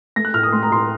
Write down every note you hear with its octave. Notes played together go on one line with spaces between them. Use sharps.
A3 A#6
F#6
A2 F6
D#6
A3 C6
A#5
A2 C6